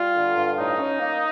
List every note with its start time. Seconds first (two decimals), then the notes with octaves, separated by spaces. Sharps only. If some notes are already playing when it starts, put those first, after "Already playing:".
Already playing: G3 F4
0.15 D3
0.36 G2
0.57 A2 D#4
0.78 C#4
0.99 A#3